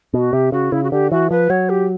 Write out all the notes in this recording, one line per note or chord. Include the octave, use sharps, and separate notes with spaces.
B2 F#4
C3 G4
C#3 F#4
C#3 E4
F#4
D3 G4
E3 F#4
F3 B4
F#3 C#5
G4